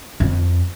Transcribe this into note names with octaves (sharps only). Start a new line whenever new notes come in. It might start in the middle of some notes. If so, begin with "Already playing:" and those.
F2